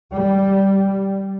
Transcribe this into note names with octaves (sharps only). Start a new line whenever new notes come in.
G3